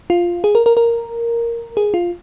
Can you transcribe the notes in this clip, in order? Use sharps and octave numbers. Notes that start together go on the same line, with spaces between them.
F4
G#4
A#4
A#4
A#4
G#4
F4